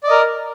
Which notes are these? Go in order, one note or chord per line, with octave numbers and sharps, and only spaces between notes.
A#4 D5 D#5